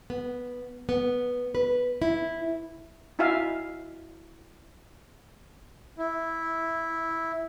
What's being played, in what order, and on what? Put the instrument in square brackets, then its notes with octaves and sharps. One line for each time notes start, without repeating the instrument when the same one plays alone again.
[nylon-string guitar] B3
B3
B4
E4
[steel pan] D#4 E4 F#4 E5 F5 G#5
[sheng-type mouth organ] E4